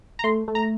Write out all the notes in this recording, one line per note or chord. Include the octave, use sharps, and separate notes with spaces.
A#5
A3 C6
A3
A#5